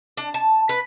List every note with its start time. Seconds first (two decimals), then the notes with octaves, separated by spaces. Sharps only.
0.17 D4
0.34 A5
0.69 B4